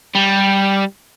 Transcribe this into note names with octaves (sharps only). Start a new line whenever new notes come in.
G3